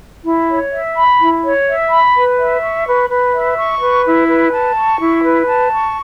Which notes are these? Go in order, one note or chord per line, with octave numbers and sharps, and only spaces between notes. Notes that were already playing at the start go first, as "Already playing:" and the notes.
E4
C#5
E5
B5
E4
C#5
E5
B5
B4
E5
C#6
B4
B4
E5
C#6
B4
E4
B4
A5
C#6
E4
B4
A5
C#6